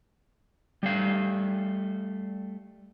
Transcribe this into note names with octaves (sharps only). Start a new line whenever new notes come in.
G3 A3 F5